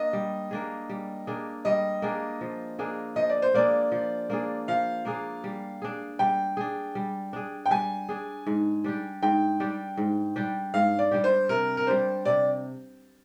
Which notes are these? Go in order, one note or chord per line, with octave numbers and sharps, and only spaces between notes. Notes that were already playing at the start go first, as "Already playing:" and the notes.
Already playing: A#3 D4 D#5
G3
A#3 D4 G#4
G3
A#3 D4 G#4
G3 D#5
A#3 D4 G#4
F3
A#3 D4 G#4
F3 D#5
D5
C5
A#3 D4 G#4 D5
F3
A#3 D4 G#4
F3 F5
A#3 D4 G#4
G3
D4 G#4
G3 G5
D4 G#4
G3
D4 G#4
G5
G3 G#5
D4 G#4
G#2
G3 D4 G4
G#2 G5
G3 D4 G4
G#2
G3 D4 G4
G#2 F5
D5
G3 D4 G4
C5
C3 A#4
A#4
G3 D4 C5
C3 D5